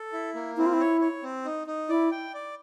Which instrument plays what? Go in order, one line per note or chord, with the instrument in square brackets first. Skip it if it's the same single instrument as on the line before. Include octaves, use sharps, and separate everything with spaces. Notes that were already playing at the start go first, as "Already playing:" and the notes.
Already playing: [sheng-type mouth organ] A4
E4
A#3
[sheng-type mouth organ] C4 [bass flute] E4
[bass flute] F4
E4
[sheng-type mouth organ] C#5
C#5
C4
D#4
D#4
[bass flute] E4 [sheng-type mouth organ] D5
[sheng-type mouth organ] G5
D5